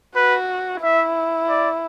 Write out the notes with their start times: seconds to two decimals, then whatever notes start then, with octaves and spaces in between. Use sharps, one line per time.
0.16 F#4 B4
0.82 E4 E5
1.49 D5